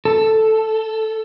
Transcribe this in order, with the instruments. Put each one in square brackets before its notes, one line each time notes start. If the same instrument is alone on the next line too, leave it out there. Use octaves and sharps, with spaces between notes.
[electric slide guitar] A4